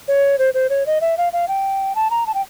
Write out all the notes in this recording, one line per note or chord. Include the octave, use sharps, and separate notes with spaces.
C#5
C5
C5
C#5
D#5
E5
F5
F5
G5
A5
A#5
A5
G5